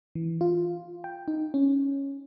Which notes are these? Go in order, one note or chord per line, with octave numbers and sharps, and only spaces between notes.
E3
F4
G5
D#4
C#4